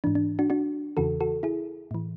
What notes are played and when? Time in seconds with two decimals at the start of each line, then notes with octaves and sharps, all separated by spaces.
0.04 G#2 E3 D4
0.15 D4
0.39 D4 F#4
0.50 D4 F#4
0.97 E2 C#3 E3 F#4 A4
1.21 F#4 A4
1.43 E4 G#4
1.91 A2 E3